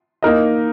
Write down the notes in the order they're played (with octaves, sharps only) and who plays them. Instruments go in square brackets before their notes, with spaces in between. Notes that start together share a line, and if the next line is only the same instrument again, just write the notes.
[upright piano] A#3 D#4 A#4 D#5